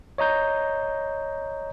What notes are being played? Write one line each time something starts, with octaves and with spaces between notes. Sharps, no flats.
C#5 D#5 A#5 G6